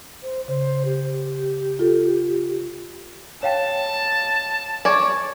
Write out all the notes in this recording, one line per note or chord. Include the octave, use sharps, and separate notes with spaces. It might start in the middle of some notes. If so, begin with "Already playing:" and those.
C5
C#3 C5
G4
F4 A4
C#5 F5 G5 A5
C#5 D5